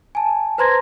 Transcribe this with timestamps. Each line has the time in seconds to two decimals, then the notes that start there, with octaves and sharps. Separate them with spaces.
0.15 G#5 A5
0.58 B4 C5 A#5 C6 G#6 A#6